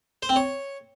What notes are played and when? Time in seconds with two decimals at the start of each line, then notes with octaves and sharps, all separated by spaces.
0.23 C5
0.29 C4
0.36 C#5